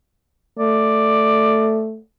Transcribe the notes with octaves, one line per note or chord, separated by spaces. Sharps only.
A3 D5